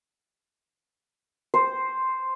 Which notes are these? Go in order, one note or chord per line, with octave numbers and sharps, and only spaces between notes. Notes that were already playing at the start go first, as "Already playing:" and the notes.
C5